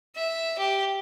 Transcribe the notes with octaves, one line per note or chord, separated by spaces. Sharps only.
E5
G4